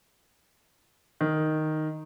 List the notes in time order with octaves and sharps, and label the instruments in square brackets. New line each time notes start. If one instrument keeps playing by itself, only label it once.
[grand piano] D#3